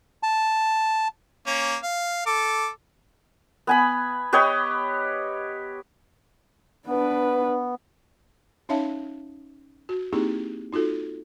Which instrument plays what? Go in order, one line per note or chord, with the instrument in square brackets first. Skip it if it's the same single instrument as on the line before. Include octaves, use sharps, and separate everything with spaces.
[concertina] A5
[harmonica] A#3 C#4
F5
A4 D6
[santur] B3 G#5 B5
G4 B4 C#5 D#5
[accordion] B3 [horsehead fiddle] D4 B4
[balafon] C#4 D#4 C#5 E5 F5 A5
F#4
A#3 C4 D#4 E4 G4 G#4
D#4 F4 F#4 A4